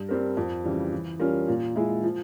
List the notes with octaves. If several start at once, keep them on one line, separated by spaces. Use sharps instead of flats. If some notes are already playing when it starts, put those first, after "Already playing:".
Already playing: G2
G3 C4 G4 A#4
F2
C#3 E3 G3
E3
G3 C#4 F4 A#4
A#2
G#3 E4 G#4
F3